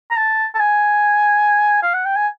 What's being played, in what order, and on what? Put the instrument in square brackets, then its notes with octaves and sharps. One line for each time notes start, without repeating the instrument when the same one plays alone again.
[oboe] A#5
A5
A5
G#5
F5
F#5
G5
G#5